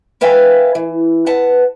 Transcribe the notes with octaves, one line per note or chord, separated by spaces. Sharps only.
A#4 B4 E5 F5 G5 G#5
E3
B4 F#5 A5